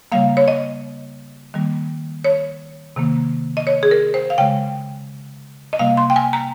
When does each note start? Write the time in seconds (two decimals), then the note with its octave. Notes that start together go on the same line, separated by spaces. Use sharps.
0.12 C#3 G3 A#3 F5
0.37 C#5
0.48 D#5
1.54 D#3 G3 A#3
2.25 C#5
2.96 C3 D#3 A#3
3.57 D#5
3.67 C#5
3.83 G#4
3.91 A#4
4.14 C5
4.30 F5
4.38 C#3 G#3 G5
5.73 D#5
5.79 C3 G3 A#3 F5
5.97 C6
6.10 G5
6.16 G#5
6.33 A#5